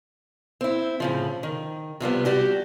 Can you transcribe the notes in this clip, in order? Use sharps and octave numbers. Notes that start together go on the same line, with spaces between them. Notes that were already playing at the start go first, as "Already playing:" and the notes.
C4 E4
A2 C#3 F3
D#3
C3 F3 G3 B3
G3 F#4 G4